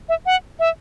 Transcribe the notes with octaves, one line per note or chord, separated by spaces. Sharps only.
E5
F#5
E5